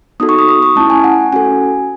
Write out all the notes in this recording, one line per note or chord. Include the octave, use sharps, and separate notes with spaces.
B3 D#4 F#4 A4 D#6
C#6
D#6
D#6
C#6
A3 C#4 E4 A5
G#5
F#5
C#4 F#4 A4 G#5